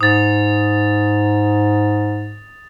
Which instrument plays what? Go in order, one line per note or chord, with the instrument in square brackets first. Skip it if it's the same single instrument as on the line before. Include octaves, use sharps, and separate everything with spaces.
[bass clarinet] G#2 [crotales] D#6 A6